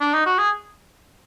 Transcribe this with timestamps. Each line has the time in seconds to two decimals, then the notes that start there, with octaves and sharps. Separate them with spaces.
0.01 D4
0.14 D#4
0.26 F#4
0.38 G#4